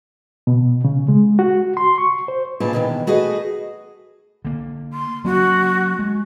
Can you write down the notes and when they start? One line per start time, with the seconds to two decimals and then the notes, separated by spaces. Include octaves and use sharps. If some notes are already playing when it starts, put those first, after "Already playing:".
0.47 B2
0.84 C#3
1.08 G#3
1.39 F#4
1.77 C6
1.98 C#6
2.28 C5
2.60 D#2 A#2 C#3 B4 A5
2.73 B2 D#3 E3
3.07 A3 F#4 G#4 B4 D#5
4.45 D3 A#3
4.93 C6
5.24 F#3 A#3 C#4 F#4
5.99 G#3